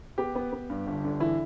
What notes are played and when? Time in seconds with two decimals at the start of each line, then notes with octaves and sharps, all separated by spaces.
0.18 B3 G4
0.35 B3
0.53 B3
0.70 G2
0.87 G1
1.04 D3
1.20 E3 E4